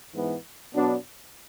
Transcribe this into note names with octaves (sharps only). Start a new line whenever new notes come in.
G#2 E3 B3
B2 F#3 B3 D4